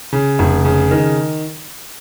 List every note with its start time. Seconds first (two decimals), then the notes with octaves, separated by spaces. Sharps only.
0.13 C#3
0.39 F1
0.65 C#3
0.91 D#3